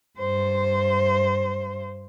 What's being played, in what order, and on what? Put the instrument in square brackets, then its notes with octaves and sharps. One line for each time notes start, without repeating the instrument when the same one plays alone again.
[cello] G2 C5